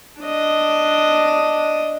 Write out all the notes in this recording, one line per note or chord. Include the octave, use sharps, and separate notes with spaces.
D4 D#5